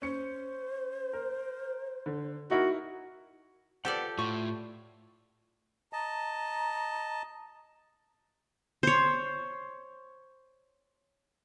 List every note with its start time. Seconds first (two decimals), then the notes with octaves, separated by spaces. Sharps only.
0.02 C#4 C5 C#7
1.13 A#4
2.06 D3
2.51 D#4 E4 F#4 A#4
3.85 F3 G4 A4 B4 D5 F#5
4.18 A2 F4 C#6
5.93 D#5 A5 A#5
8.83 C5 C#5